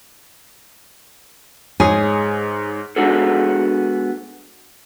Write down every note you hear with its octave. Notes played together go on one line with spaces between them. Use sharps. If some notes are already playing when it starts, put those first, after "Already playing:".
G#2 G#4 C#5 D#6
G#3 B3 D4 F#4 G#4 A4